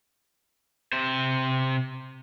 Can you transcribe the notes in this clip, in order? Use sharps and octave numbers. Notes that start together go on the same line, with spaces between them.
C3 C5